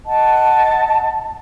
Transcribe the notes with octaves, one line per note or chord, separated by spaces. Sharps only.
D#5 F#5 A5